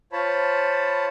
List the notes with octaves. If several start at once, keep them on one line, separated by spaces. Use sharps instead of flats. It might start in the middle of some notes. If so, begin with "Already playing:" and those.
F4 C5 C#5 A5 B5